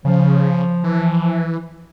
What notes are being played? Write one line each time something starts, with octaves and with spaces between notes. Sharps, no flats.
C#3 F3
E3